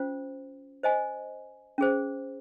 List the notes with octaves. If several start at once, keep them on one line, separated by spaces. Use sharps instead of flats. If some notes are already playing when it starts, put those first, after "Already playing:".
Already playing: C#4 F4 C5
C5 D#5 G#5
C#4 G#4 C5